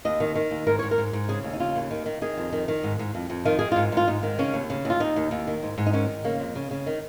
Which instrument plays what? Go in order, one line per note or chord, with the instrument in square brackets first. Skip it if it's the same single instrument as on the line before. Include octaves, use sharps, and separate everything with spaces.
[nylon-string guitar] D#2 D#5
D#3
D#3
D#2
G#2 A#4
G#2 C#5
A#4
G#2
G#2
C#3 G#4
D#2
D#4
C#3 F4
D#2
D#3
D#3
D#3 G#4
F2
D#3
D#3
G#2
G#2
F2
F2
D#3 F4
D#3 G#4
G#2 F4
G#2 F4
G#2 D#4
D#3
C#3 C#4
D#2
C#3
D#2 F4
D#2 D#4
D#2
D#2
D#3
G#2
G#2
D#4
D#3 C#4
G#2
C#3 A#3
F2
C#3
C#3
D#3